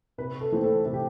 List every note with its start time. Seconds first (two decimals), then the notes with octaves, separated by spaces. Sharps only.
0.18 C3 B4
0.41 A4
0.52 E3 A3 C4
0.64 A4
0.86 C3 A4
0.94 G4